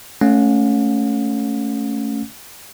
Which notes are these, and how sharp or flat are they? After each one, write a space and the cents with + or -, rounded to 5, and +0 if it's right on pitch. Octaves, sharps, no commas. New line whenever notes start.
A3 +0 C#4 +0 F5 +45